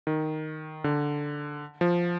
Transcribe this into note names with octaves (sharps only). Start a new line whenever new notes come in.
D#3
D3
F3